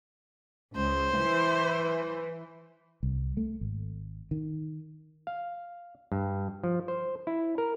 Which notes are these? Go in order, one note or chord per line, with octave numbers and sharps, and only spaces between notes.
C#2 C5
E3
C2
A3
G#1
D#3
F5
G2
F3
C5
E4
A#4